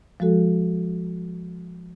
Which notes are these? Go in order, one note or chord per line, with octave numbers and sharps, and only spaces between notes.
F3 G#3 F#4 A4